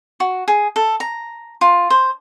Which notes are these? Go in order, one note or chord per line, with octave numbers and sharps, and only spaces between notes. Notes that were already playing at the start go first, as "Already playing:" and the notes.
F#4
G#4
A4
A#5
F4
C5